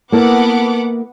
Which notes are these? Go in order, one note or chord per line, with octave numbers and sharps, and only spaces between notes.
A#3 B3 E4 A4 F#5 D6